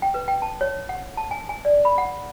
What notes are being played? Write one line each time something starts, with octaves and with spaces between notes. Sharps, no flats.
G5
B4
G5
A5
C#5
F#5
A5
G#5
G#5
D5
B5
F#5